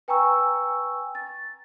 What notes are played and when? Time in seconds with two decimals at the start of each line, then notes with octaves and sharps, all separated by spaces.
0.08 B4 G5 G#5 A#5 C#6 E6
1.15 A6